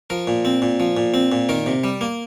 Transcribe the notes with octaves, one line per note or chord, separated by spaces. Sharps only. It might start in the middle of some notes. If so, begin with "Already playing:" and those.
F3 A#4
A#2
C4
A#2
F3
A#2
C4
A#2
D#3 A#4
C3
G3
A#3